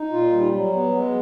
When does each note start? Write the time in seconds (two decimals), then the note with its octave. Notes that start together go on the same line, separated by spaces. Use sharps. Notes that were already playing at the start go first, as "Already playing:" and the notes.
Already playing: D#4
0.11 A#2 F4
0.32 G3
0.52 F#3
0.74 B3
0.93 G#3